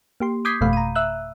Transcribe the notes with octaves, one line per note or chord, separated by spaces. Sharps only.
A#3 G4 C6
D6 D#6 G6 G#6 B6 C7
G1 F2 B2 A3 F5 B5
A#5 D#7
E5 E6 F#6